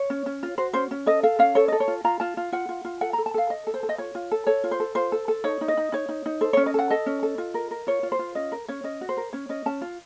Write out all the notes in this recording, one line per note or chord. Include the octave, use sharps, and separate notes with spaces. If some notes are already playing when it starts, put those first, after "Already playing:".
Already playing: C#5
C#4
C#4
F4
F#4 C5
C#4 C5
C#4
A4 D#5
A4 F5
C#4 F5
A4 C#5
A4 D#5
C#5
F4
F4 A#5
F4 A5
F4
F4 F#5
F4
F4
A4 F#5
A4 A#5
A5
A4 F5
A4 D#5
A4
C5
A4
D#5
F4 C#5
F4
A4
A4 C#5
F4
C5
A4
F4 C5
A4
A4
D#4 C#5
D#4
D#5
D#4
D#4 C#5
D#4
D#4
A4 C5
C#4 C#5
D#5
A4 F#5
A4 D#5
C#4
A4
F4
A#4
A#4
F4 C#5
F4
C5
F4
C#4 D#5
A#4
C#4 C#5
C#4 D#5
F#4
C5
A#4
C#4 C#5
C#4 D#5
C#4 A5
F4